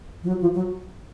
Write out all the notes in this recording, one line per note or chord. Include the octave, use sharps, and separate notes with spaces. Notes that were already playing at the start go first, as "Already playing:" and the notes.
F3
F#3
F3
F#3